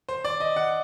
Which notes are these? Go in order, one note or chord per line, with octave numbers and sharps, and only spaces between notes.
C5
D5
D#5
F#5